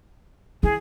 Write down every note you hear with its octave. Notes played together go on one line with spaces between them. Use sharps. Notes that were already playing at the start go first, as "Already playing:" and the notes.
E3 G#4